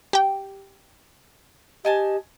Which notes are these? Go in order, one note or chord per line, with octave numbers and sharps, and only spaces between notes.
G4 G5
G4 D#5 G#5 A5